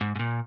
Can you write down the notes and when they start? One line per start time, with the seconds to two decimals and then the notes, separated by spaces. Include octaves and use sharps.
0.01 G#2
0.16 G#2
0.19 A#2